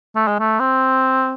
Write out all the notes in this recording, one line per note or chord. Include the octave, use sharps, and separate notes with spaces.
A3
G#3
A3
C4